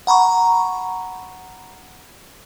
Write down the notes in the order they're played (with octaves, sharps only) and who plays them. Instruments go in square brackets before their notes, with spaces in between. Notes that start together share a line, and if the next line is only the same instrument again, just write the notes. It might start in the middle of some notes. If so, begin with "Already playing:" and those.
[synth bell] F#5 A#5 B5 C#6